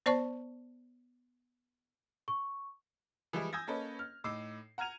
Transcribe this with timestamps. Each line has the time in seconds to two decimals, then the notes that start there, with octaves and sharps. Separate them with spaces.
0.06 B3 C5 D5 A5 C#6
2.28 C#6
3.33 E3 F3 G3 G#3 E4
3.53 G#5 D#6 E6 G6 G#6 A#6
3.67 A#3 C#4 A4 B4 C#5 D#5
3.99 F6
4.24 A2 D#4 D6 E6 C7
4.78 F#5 A#5 F6 G#6 D#7 F7